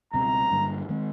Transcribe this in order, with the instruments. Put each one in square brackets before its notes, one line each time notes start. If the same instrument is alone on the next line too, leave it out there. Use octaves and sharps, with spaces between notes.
[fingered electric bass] C#2 B2 G3 C4 [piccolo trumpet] A#5
[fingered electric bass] G2 D3 G3 A#3
D#3 G#3 C4